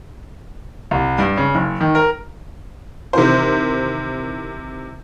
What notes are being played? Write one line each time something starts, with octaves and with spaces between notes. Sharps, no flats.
C2
G2
C#3
F#1
D#3
A#4
C3 D#3 E3 A#4 C5